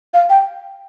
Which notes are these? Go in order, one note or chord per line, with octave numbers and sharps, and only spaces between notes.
F5
G5